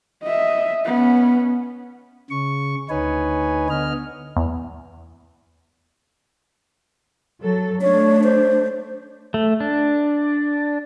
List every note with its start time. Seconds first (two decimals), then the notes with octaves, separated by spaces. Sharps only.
0.23 D#5 E5
0.85 B3 C#4
2.30 C#3 C#6
2.90 D2 D#4 B4 C#5 G#5
3.70 D3 B3 D#5 F6
4.37 E2
7.41 F#3 A4
7.82 A3 D4 C#5
8.24 C5
9.34 A3
9.60 D4